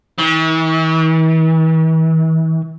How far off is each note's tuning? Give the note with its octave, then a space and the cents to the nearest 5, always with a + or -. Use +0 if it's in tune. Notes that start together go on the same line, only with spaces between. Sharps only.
E3 -45